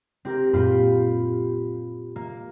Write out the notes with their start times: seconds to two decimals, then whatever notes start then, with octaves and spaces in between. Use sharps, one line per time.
0.25 C4 G4 A#4
0.53 F#2 A#2 F4 G4 B5
2.16 A#3